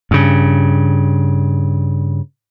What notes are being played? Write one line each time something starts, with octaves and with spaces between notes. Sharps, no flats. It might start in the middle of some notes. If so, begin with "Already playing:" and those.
G2 C#3